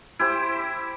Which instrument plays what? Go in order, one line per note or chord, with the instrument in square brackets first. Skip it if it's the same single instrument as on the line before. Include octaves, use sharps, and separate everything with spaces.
[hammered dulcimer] E4 G4 C5